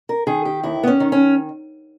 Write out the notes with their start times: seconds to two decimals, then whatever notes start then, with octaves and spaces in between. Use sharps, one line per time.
0.09 A#4
0.27 D#3 G#4
0.45 G4
0.63 D#2 E4
0.83 B3
0.87 C#4
1.00 D#3
1.12 C#4